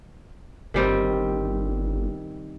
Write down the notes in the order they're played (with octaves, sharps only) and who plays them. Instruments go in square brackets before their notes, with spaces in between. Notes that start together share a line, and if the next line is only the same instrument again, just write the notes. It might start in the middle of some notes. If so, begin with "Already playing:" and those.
[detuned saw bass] G1 [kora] D#3 G3 C4